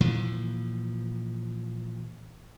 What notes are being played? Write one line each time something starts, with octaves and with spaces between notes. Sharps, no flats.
A#2 E3 F3